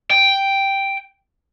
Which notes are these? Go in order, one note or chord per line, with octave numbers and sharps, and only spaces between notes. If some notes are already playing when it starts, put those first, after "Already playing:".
G5